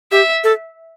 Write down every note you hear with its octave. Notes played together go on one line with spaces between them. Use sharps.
G4 E5
A4